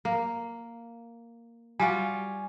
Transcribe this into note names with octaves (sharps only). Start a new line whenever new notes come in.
A#3
G3 F4 F#4 G#5